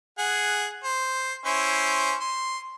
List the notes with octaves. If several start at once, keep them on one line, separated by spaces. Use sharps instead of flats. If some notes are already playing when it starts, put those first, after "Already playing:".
G#4 F#5
C5
C#4 E4 C5
C6